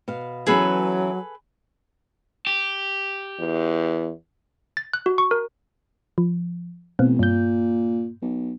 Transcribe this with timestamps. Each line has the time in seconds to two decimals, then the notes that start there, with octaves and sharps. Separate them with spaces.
0.08 B2 F5
0.47 E3 F#3 B3 C#4 G#4 A4 B4
2.47 G4
3.40 E2
4.77 A6
4.93 F#6
5.06 F#4
5.18 C#6
5.31 A#4
6.18 F3
6.99 A1 B2 B3 C4
7.19 G2 A#2 G6
8.22 B1